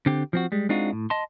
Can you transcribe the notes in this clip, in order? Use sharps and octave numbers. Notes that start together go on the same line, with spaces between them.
D3 C4 G4
F3 C4 F#4
G3 G#3
G#3 C4 D4 D#4 F4 F#4
A2
D#5 A5 C6